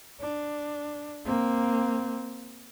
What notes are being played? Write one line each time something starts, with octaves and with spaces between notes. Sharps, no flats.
D4
A#3 C4